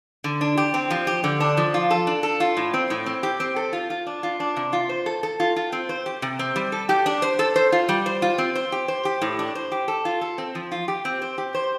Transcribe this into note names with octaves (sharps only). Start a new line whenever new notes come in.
D3
D4
G4
C4
F3
G4
D3
D4
F3
F4
A4
D4
A4
F4
A2
C4
A2
C4
G4
C4
A4
F4
F4
D4
F4
D4
C3
F4
C5
A4
A4
F4
F4
C4
C5
G4
C3
C4
G3
A4
G4
D4
C5
A4
C5
F4
G3
C5
F4
C4
C5
G4
C5
G4
A2
D4
C5
G4
A4
F4
A4
C4
F3
F4
G4
C4
C5
G4
C5